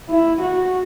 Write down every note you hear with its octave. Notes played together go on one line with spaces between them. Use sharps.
E4
F#4